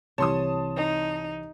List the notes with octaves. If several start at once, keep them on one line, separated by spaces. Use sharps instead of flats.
C2 C3 E3 C#5 A5 C6 D#6
D#4